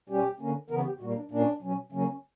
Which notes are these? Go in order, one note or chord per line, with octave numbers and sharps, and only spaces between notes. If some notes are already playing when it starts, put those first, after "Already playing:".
B2 G3 C#4 G4
D3 A#3 C#4
C#3 E3 B3 A#4
G4
A#2 G3 A#3 F#4
D4
A#2 A#3 C#4 D4
B2 F#3 C#4
C#3 F#3 A#3 C#4
C#4